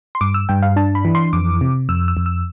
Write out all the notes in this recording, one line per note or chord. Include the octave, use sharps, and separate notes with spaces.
C6
G2 D6
E6
G2 G5
F5
D4 A5
B5
E3
C6
F2 D6
C3
F2 E6
E6
F2
E6